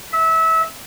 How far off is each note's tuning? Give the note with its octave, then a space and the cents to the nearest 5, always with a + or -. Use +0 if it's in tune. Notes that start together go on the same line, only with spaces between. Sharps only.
E5 -25